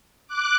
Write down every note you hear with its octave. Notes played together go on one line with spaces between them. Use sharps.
D6 F#6